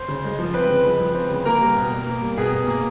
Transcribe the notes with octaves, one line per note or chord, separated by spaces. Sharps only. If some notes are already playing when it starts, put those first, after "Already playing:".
Already playing: C5
C#3
G#3
F3
C4 B4
C#3
G#3
F3
C4
C#3
A#3 A#4
G3
B2
B2
A#3
G3
B2 G#4
B2
A#3